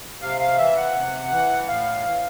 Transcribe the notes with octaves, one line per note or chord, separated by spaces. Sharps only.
C3 F5
F5
E3 E5
F#5
C3
E3
A2 F5
E3